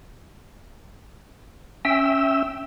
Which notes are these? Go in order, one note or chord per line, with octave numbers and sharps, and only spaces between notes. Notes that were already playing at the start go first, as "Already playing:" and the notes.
C#4 E5 G5 E6